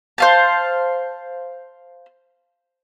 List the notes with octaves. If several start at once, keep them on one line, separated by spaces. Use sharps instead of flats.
C5 F5 A5